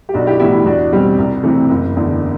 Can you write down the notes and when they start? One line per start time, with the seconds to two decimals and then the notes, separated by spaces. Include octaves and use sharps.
0.09 G4
0.14 B1 D4 F#4
0.26 E4 G4
0.40 A2 E3 B3 E4 G4
0.53 E4
0.65 E2 D4 F#4
0.92 B2 G3 C4
1.18 C2
1.43 C3 E3 A3 C4
1.70 F#1
1.96 E2 D3